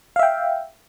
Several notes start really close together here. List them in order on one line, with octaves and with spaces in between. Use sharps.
F5 E5 G5